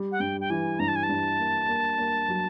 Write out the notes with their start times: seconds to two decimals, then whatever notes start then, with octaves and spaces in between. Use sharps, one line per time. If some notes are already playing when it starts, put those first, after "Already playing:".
Already playing: G3
0.12 F#5
0.20 G2 G5
0.40 G5
0.50 E3 G#5
0.79 G2 A#5
0.88 A5
0.95 G#5
1.03 A5
1.09 G2
1.39 A#3
1.68 A#3
1.99 A#3
2.28 F#3